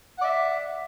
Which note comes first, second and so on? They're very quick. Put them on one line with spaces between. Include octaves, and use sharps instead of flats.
F#5 D5 E5